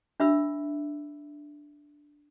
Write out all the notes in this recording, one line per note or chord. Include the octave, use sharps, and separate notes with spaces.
D4 E5 B5 E6